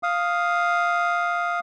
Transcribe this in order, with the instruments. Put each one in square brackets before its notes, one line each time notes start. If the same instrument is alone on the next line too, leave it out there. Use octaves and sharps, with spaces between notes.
[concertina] F5 D#6